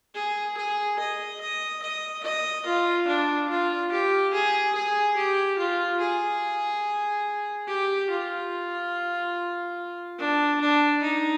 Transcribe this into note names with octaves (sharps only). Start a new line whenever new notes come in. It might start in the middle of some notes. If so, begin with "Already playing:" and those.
G#4
G#4
D#5
D#5
D#5
D#5
F4
D4
F4
G4
G#4
G#4
G4
F4
G#4
G4
F4
D4
D4
D#4